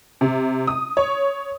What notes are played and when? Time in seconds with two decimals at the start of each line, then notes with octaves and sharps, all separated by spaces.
0.21 C3
0.67 D#6
0.97 C#5